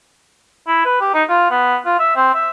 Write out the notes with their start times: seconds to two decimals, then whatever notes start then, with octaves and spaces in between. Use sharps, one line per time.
0.67 E4
0.85 B4
1.01 G4
1.14 D#4
1.29 F4
1.50 B3
1.85 F4
1.99 E5
2.16 C4
2.34 E5